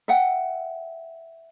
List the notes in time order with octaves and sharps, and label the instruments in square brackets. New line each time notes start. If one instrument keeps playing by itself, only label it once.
[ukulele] E5 F#5 G5